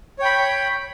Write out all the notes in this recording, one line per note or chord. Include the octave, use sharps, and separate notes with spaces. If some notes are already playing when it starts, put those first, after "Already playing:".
C#5 G5 B5